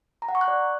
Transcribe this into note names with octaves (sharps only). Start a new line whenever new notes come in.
A#5
F#5
C#6
F#6
D5